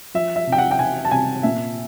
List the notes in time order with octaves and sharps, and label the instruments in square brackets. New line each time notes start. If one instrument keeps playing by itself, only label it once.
[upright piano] F3 [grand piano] E5
[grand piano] E5
[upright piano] C3
[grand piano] G5
F#5
G5
[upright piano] C3 [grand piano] G#5
[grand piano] A5
[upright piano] C3 [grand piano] G#5
[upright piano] A#2 [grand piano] E5